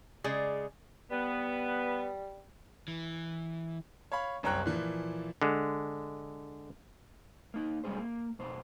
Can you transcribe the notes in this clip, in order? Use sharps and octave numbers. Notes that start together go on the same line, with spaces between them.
C#3 G#3 G#4 D5
G3 B3
E3
C#5 F5 B5
F#1 C2 C#5 G5 A#5 F#6
A#2 E3 F3
D3 G#3
A#3 D#4
B1 G3 G#3 C#4 G#4 C5
A#3
B1 F2 C5